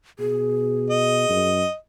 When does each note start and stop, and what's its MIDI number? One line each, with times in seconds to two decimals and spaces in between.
0.19 1.28 47
0.19 1.49 68
0.90 1.74 75
1.29 1.64 42